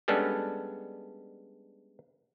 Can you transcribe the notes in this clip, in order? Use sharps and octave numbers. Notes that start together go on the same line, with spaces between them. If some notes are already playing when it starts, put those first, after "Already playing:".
G3 G#3 B3 C#4 D4 A4